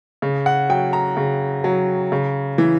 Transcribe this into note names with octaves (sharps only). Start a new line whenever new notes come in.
C#3
F#5
F#3 G5
A#5
C#3
F#3
C#3
E3